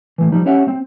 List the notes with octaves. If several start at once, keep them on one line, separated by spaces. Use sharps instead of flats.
A2 E3
F3 G3 D#4
C#4 G4 C#5 E5 F#5
C4